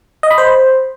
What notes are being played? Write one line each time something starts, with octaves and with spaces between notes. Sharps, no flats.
D#5
B5
C5